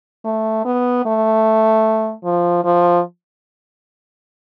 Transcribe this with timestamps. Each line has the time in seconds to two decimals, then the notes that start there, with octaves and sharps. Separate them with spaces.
0.25 A3
0.65 B3
1.05 A3
2.24 F3
2.64 F3